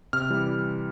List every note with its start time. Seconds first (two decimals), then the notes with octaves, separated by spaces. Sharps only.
0.13 C3 F6
0.30 E3 G3